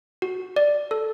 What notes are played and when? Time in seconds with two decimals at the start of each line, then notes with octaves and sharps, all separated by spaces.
0.22 F#4
0.56 D5
0.91 A4